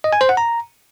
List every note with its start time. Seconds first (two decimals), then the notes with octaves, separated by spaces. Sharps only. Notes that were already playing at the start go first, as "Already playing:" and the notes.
0.04 D#5
0.13 G#5
0.21 C5
0.29 F#5
0.37 A#5